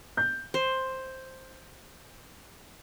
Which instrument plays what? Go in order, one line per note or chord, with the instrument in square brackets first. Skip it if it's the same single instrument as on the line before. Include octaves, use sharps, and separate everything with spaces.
[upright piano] G6
[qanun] C5